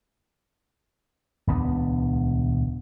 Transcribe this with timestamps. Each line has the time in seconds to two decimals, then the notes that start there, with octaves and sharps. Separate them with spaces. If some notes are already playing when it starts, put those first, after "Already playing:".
1.47 D#1 C#2 B3 D4